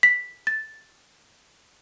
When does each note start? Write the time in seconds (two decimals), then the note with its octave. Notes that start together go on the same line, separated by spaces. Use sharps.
0.03 B6
0.47 A6